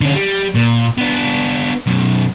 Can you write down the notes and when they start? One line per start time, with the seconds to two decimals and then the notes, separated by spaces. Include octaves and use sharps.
0.01 D3 C#4
0.14 G3
0.55 A#2
0.98 B3 D4
1.87 F#2 B2